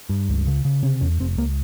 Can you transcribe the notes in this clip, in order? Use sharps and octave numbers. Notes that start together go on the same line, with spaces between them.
G2
C#2
C#3
C#3
C3 C#4
E2 C#4
F1 C4
C#2 A#3